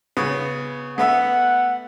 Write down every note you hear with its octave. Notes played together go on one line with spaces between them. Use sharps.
C#3 B3
A3 B3 E5 F#5